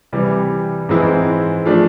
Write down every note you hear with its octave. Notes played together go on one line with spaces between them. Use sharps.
C3 E3 G3
G#2 E3 G#3 C4 E4
F3 A3 D4